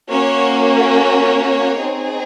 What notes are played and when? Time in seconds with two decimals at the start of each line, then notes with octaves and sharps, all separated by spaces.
0.10 A#3 C#4 F#4 C#5
0.94 C#5
1.78 C4 D#4 G#4